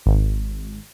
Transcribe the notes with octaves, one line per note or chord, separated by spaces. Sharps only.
G#1